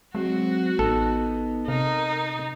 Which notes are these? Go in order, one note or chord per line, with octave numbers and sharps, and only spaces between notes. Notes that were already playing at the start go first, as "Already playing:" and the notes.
F#3 G#3 C4 F#4
A1 B3 D#4 A4
C3 D#4 A#4